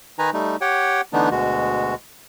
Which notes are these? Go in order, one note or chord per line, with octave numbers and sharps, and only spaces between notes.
D#3 D#4 B4 G#5 A#5
G3 A3 D#4
G4 C#5 F#5 G5
D3 E3 A3 B3 D4 D#4
D2 B2 G#3 F#4